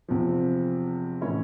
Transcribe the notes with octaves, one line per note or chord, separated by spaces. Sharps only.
E2 C3 F3
A2 E3 C#4 C#5